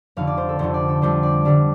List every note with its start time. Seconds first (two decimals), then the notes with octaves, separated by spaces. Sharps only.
0.17 F1 F2 D3 F5
0.27 D5
0.38 C5
0.49 A4
0.59 F1 F2 D3 C5
0.74 D5
0.89 A4
1.02 F2 D3 G3 D4 C5
1.23 D5
1.45 F2 D3 G3 D4